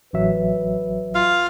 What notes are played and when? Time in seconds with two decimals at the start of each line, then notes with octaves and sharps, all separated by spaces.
0.13 A1 F#3 B4 E5
1.15 F4 F5